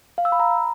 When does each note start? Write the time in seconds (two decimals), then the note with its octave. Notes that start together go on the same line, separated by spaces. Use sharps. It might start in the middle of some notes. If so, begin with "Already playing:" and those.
0.18 F5
0.25 E6
0.32 B5
0.39 A#5